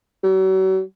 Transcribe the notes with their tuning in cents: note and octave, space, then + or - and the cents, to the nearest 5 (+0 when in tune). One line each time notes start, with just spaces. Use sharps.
F#3 +40